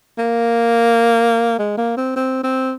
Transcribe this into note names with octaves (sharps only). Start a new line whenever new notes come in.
A#3
G#3
A#3
C4
C4
C4